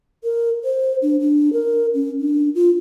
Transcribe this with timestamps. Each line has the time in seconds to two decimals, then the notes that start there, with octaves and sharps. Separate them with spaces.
0.24 A#4
0.64 C5
1.02 D4
1.20 D4
1.53 A#4
1.94 C#4
2.20 D4
2.55 F4